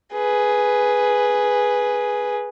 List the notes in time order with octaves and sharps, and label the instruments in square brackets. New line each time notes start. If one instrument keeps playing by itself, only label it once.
[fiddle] G#4 B4